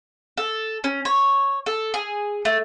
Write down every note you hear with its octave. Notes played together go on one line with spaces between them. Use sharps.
A4
C#4
C#5
A4
G#4
A3